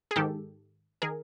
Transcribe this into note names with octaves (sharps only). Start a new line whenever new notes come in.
G#4
G#2 D#3 G4 A4
D#3 G#4 A#4